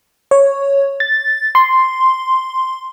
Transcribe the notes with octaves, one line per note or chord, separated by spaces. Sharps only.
C#5
A6
C6